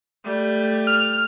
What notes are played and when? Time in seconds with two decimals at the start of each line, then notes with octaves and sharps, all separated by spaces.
0.25 G3 A3
0.87 F6